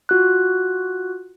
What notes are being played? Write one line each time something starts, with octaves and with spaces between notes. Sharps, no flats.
F4 F#4 F#6